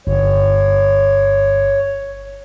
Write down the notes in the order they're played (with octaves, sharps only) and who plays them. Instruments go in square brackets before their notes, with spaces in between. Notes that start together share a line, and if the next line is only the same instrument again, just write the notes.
[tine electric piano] G1 [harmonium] C#5